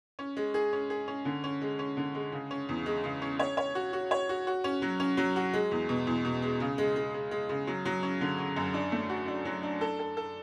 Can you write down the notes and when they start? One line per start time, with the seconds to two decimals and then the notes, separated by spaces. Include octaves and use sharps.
0.19 C#4
0.37 G#3
0.54 G#4
0.73 C#4
0.90 G#4
1.08 C#4
1.25 D3
1.44 C#4
1.62 G#3
1.79 C#4
1.97 D3
2.15 G#3
2.32 C#3
2.51 C#4
2.69 E2
2.86 G#3
3.04 C#3
3.22 C#4
3.39 C#5
3.57 C#5
3.75 F#4
3.93 F#4
4.11 C#5
4.29 F#4
4.47 F#4
4.64 C#4
4.82 F#3
5.00 C#4
5.17 F#3
5.36 F#4
5.53 G#3
5.71 E2
5.89 B2
6.07 E2
6.25 B2
6.42 G#3
6.60 C#3
6.78 G#3
6.96 G#3
7.14 G#3
7.31 G#3
7.49 C#3
7.67 F#3
7.85 F#3
8.03 C#4
8.21 D3
8.38 C#4
8.56 F#2
8.74 D4
8.92 A3
9.09 F#4
9.28 D4
9.45 F#3
9.63 D4
9.81 A4
9.99 A4
10.17 A4